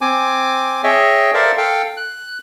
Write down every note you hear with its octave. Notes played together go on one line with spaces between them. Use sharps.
C4 G#5 D6
G#4 C#5 D#5 E5 G5
A4 A#4 C5 D5 E5 F5
A4 F5 G5
F#6